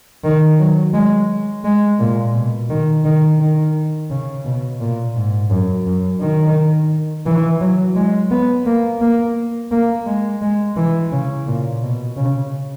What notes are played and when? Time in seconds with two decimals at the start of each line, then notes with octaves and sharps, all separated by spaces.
0.24 D#3
0.59 F#3
0.94 G#3
1.64 G#3
2.00 A#2
2.34 B2
2.70 D#3
3.05 D#3
3.39 D#3
4.10 C#3
4.45 B2
4.80 A#2
5.15 G#2
5.50 F#2
5.86 F#2
6.21 D#3
7.26 E3
7.61 F#3
7.96 G#3
8.31 B3
8.66 A#3
9.01 A#3
9.71 A#3
10.06 G#3
10.42 G#3
10.76 E3
11.12 C#3
11.47 A#2
11.82 B2
12.17 C#3